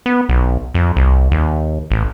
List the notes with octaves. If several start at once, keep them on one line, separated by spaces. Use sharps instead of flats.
B3
B1
F2
C2
D#2
A1